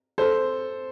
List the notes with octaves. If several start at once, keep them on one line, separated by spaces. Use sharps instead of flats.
A4 C5